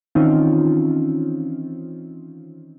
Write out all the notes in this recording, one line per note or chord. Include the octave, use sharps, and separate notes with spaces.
D#3 E3 C4 C#4 D#4 F4